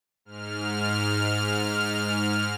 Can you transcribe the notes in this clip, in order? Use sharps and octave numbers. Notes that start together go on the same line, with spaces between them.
G#2 F6